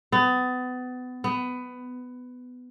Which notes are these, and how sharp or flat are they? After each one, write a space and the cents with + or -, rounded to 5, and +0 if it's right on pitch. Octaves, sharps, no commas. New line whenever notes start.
B3 +30
B3 +15